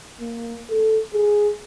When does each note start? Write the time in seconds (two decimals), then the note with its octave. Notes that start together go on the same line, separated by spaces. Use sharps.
0.20 A#3
0.69 A4
1.14 G#4